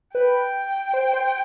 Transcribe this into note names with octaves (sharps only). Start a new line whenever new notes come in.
B4 G5
C5
C5